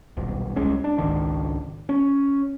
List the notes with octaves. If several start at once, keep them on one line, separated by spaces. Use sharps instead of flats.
D#1 B1
C2 G#3 C#4
D4
G#1 C#2 D#3 D4
C#4